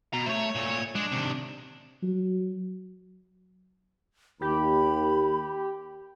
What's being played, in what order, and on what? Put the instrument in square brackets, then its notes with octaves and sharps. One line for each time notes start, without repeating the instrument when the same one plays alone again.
[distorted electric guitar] B2 [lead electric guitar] A#5
[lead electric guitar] A3 [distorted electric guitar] C5 C#5
[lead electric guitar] A#2 A3
[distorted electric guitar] G#3 [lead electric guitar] D4
[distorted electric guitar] C3 D#3
[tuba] F#3
[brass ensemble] D#2 [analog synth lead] G4 [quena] B5